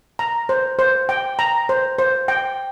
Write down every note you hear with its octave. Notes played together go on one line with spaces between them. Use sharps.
A#5
C5
C5
G5
A#5
C5
C5
G5